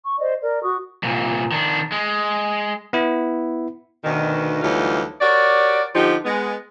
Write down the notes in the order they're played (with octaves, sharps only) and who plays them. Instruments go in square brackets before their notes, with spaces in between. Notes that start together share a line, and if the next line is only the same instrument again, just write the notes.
[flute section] C#6
C5 D5 D#5
A#4 D5
F#4 C#6 D#6
[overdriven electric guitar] C2 A#2
D#3 D4
G#3
[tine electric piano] B3 E4
[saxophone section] D2 B2 D#3
D2 E3 F#3 G3 D#4 F4
F#4 G4 A#4 C#5 D5
D3 F3 D#4 G4
G#3 B3